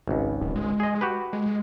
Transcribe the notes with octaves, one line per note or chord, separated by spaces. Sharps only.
G#1 C#2
D1
G#3
G#4 D#5
F#4 G4 B4
G#3